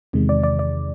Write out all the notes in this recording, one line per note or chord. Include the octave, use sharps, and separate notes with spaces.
E2 C3 D#3 G#3
D5
D5
D5